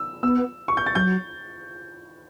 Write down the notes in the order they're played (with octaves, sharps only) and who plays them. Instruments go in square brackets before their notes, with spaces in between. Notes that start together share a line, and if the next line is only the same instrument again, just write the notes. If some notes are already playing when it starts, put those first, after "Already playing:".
Already playing: [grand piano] E6
[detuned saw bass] B3 [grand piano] E6
[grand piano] C#6
G6
A6
[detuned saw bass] F#3 [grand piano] G6